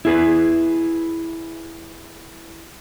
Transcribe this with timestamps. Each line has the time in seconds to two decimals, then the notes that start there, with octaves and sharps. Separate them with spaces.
0.05 E4 G#4 B4